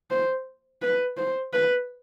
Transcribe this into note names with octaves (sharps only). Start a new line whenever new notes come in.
C5
B4
C5
B4